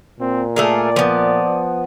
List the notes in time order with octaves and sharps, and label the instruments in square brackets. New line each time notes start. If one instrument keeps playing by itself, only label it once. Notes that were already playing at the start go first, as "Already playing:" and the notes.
[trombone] A#2 [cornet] C4
[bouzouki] A3 G#4 A#4 [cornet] D5
[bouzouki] F3 B3